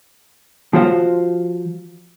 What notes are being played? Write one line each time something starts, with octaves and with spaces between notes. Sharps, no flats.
F3 F4 F#4 C5 F5